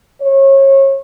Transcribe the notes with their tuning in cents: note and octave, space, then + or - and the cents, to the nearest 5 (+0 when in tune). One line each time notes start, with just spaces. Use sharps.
C#5 -30